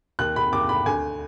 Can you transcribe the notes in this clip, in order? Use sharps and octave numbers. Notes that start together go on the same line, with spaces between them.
D#2 F#6
B5
D#2 D6
B5
D2 G#5